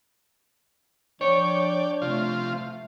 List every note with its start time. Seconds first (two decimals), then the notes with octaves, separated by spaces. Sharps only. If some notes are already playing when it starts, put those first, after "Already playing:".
1.21 F3 D4 C#5 D5 G5
2.02 C3 F3 A3 F4